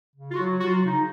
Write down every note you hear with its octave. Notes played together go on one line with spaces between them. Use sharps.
C#3
F4
F#3 F#4
F#3 F#4
F4
C#3 D#4